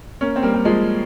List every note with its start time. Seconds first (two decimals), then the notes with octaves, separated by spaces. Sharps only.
0.21 A#3 C#4
0.36 C4
0.43 G3 A#3
0.54 G3
0.65 F3 G#3